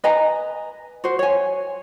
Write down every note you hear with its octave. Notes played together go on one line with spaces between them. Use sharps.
B4 D#5 G#5 A#5
F#4 C5
C#5 G#5